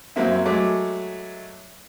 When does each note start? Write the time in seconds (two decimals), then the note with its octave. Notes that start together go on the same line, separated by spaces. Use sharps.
0.16 F#2 F#3 A#3 C4 E4
0.45 F#3 G#3 A3 D6